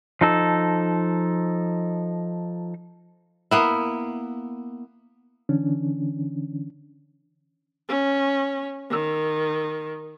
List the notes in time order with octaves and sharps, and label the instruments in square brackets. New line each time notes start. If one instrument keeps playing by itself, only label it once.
[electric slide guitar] F3 D#4 A4
[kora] A#3 B3 E4
[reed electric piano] D3 E3 C#4 D4
[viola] C#4
D#3